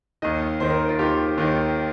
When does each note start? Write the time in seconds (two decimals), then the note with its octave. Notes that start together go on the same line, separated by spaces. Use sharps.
0.22 D#2 D#3 D#5
0.60 D#2 D#3 C5
0.70 A#4
0.89 F4
0.99 D#2 D#3 G4
1.37 D#2 D#3